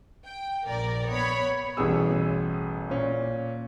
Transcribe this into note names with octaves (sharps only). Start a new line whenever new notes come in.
G5
A#1 A#4 D5
B3 C#5 B5
A1 B2 E3 G3 G#4 E6
A#2 C#4